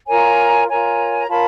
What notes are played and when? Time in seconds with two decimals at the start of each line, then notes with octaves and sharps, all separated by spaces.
0.08 F4 A#4 C#5 G#5 A#5
0.68 F4 A#4 C#5 G#5 A#5
1.17 A#5
1.28 F4 A#4 C#5 A5 B5